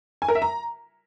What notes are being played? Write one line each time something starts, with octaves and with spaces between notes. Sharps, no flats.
G#5
A#4
E5
A#5